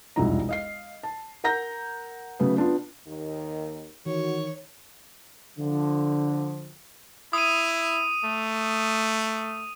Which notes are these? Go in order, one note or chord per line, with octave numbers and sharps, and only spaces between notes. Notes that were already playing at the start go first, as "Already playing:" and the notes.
E1 C2 F2 D#4 E4 A#5
D#5 F5 C7
A5
A#4 F#5 A#5 G6 A#6
C#3 F#3 A3 B3
B3 D4 F4
D#2 D#3
D#3 E3 F#4 C#5
D3 F3
E4 D#6 D#7
A3